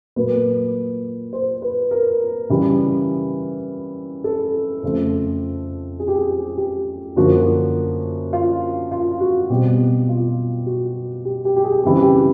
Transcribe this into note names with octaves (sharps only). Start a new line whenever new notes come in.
A#2 F#3 A#3 B4
C5
B4
A#4
C#3 E3 G3
A4
F2 C#3 F3 A3
G#4
G4
G#4
G4
F#2 D3 F3 A#3 F#4
F4
F4
F#4
B2 G3 C4 G4
F4
F#4
G4
G4
G4
G#4
C#3 E3 G3 C4 G4
G4